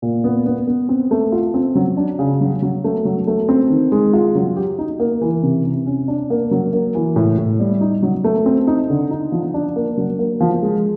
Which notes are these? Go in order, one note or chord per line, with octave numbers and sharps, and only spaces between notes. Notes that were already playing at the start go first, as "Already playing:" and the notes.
A#2
B3
B3
B3
C4
A3
F4
C4
F#3
D4
C#3
F#3
F#3
A3
F#3
A3
C4
D#3
G#3
F4
F#3
G4
D#4
A#3
E3
C3
C3
C#4
D4
A#3
F#3
A#3
E3
A2
A2
G3
D#4
F#3
A3
C4
D#4
D3
D#4
F3
D4
A#3
F#3
A#3
F3
G#3